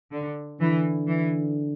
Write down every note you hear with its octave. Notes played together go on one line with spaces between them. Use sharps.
D3
D3 E3
E3